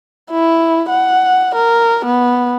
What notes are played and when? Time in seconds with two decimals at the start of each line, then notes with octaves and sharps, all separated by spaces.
0.31 E4
0.90 F#5
1.55 A#4
2.05 B3